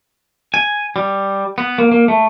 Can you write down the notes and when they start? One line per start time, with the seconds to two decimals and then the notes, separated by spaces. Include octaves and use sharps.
0.54 G#5
0.96 G3
1.58 B3
1.78 A#3
1.92 A#3
2.08 A3